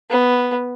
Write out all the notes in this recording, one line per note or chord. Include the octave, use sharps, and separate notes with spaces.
B3